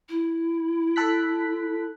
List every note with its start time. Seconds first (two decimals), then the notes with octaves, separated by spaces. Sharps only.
0.09 E4
0.96 A4 F#6 B6